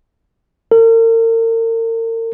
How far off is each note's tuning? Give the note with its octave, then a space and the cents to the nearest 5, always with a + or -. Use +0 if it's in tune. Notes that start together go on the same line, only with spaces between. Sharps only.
A#4 -40